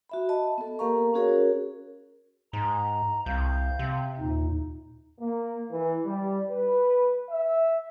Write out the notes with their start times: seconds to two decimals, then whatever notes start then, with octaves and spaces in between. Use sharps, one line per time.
0.09 F#4 E5 B5
0.29 D#5 A5 B5
0.58 B3 A4
0.79 A#3 G4 A#4 F5 A#5 C#6
1.14 C#4 F#4 G#4 A#4 C#5
2.53 G#2 A#5
3.26 C2 F5 G6
3.79 C3
4.19 D#2 A#2 D#4
5.20 A#3
5.71 E3
6.05 G3
6.51 B4
7.30 E5